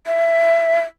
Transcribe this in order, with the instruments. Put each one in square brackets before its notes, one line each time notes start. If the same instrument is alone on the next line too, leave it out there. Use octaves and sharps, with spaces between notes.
[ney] E5